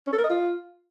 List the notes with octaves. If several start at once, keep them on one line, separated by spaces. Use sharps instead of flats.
C#4
A4
A#4
D#5
F4